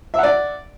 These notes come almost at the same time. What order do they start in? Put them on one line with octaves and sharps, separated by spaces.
E5 F#5 D5